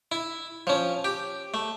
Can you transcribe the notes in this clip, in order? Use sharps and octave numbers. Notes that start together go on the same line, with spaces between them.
E4
F3 C#4
G4
A3